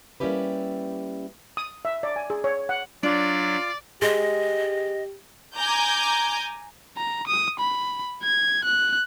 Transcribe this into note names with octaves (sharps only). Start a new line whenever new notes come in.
G3 A#3 C#4 E4 G4 B4
D#6
E5
D5
G#5
G#4
C#5
F#5
F#3 D4 F4 D5
G#3 G4 D#5
G#5 A#5 D6 G6
A#5
D#6
B5
G#6
F#6